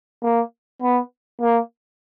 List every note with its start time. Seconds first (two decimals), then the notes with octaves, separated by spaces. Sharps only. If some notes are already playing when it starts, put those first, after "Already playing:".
0.23 A#3
0.82 B3
1.41 A#3